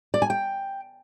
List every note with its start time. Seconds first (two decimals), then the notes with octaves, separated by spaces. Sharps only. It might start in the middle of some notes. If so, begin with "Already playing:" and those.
0.14 D5
0.22 G#5
0.30 G5